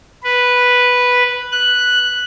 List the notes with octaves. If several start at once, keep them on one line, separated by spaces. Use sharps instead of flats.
B4
F#6